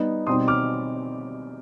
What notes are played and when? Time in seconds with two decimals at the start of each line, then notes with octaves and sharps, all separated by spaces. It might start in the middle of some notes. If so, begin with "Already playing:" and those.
Already playing: G3 B3 D#4
0.27 B2 G3 C4 D#4 C6 D#6
0.48 D6 F6